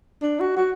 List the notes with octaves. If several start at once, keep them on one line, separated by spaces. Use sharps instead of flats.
D4
F#4
F#4